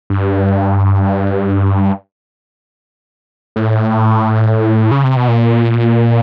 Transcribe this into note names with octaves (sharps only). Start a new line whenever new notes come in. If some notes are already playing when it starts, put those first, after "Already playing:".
G2
A2
C#3
C3
B2
A#2